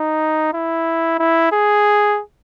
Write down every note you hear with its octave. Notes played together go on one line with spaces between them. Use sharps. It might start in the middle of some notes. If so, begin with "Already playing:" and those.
Already playing: D#4
E4
E4
G#4